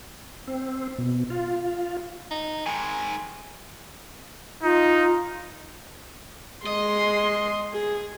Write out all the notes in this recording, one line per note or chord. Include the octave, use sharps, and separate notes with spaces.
C4
B2
F4
D#4
D#3 G#3 G#5
D#4 F4
G#3 D#5 C6
G#4